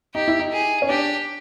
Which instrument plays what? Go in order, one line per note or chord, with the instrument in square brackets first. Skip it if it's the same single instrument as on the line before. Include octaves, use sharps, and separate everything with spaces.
[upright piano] D#4 [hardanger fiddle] G4
[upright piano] E4
D#4
[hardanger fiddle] G#4
[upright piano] C#4
[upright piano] D4 [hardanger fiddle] G4